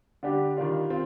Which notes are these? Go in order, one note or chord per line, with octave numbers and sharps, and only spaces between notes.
D3 G3 D4 G4
D#3 G3 D4 F4
C4 F4